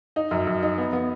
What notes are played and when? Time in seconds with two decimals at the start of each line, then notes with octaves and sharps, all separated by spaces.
0.16 D#4
0.31 F#2
0.47 F#2
0.63 D#4
0.78 B3
0.93 B3